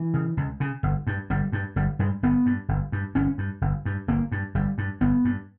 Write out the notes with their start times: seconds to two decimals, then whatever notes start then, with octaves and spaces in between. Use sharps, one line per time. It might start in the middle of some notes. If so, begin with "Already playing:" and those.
Already playing: E3
0.14 C#3
0.37 C#2
0.60 C#3
0.83 G1
1.07 G2
1.30 G1 G3
1.52 G2
1.76 G1 G3
1.99 G2 G#3
2.23 G1 B3
2.46 G2
2.68 G1
2.92 G2
3.15 G1 C#4
3.38 G2
3.61 G1
3.85 G2
4.08 G1 A#3
4.32 G2
4.55 G1 G3
4.78 G2
5.01 G1 B3
5.25 G2